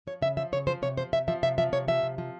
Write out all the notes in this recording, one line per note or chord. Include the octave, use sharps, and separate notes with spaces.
F3 C#5
C#3 E5
F3 E5
C#3 C#5
F3 C5
C3 C#5
F3 C5
C3 E5
F3 E5
C3 E5
F3 E5
C3 C#5
F3 E5
C3
F3